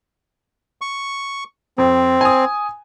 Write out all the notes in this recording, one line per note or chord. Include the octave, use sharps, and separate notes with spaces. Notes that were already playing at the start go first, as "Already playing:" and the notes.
C#6
F2 C4
G#5 D#6